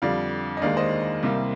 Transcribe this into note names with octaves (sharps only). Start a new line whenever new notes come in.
F2 D3 G3 D5 F5
D#5
D#2 D#3 G#3 D5 F5
C5 D#5
C2 C3 G3 A#3